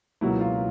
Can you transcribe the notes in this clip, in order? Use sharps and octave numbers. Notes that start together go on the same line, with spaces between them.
C#2 B2 F#3 A#3 E4
F4